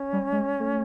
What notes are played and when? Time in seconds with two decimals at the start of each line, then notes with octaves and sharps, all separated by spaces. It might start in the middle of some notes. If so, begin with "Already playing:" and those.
Already playing: C#4
0.13 G3
0.32 G#3
0.60 A3